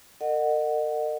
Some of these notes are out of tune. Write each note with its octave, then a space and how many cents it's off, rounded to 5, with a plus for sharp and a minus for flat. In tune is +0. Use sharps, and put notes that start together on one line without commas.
A#4 -40 D#5 -35 F#5 +0